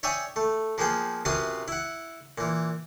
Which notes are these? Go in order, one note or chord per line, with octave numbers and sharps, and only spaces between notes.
C#5 D5 E5 G5 G#5 D#6
A3
F3 A#3 B3 G#4 G5
F#2 C3 F4 B4 C6 D#6
E4 F#5
A#2 E3